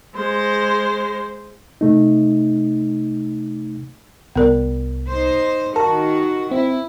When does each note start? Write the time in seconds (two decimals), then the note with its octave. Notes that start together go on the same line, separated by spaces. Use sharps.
0.15 G#3 C5
1.81 C3 A3 D#4
4.36 C2 B3 A#4 D5
5.09 D#4 C5
5.76 D#3 F#4 A#4 A5
6.51 C4 E4